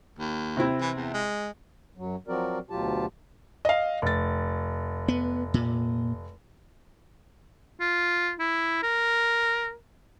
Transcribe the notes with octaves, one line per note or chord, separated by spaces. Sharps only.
D#2
C3 C4 E4
E3
E2
G#3
F#2 F#3
F3 F#3 C4 F#4 A#4 D5
D2 B2 F#3 F4 G4 A5
D#5 F5
F1 A6
B3
A#2
F4
E4
A#4